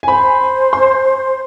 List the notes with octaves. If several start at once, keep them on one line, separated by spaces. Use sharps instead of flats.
G#5
C5 B5
C6